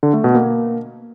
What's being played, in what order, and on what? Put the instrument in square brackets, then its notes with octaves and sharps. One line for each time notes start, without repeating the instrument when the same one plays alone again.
[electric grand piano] D3
A3
B2
A#3